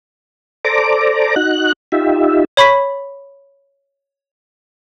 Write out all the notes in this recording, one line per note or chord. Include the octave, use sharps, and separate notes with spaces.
A4 C5 D5 A#5 D6
D#4 F#4 F#6
D#4 F4 G4 E5
C#5 B5 C#6 B6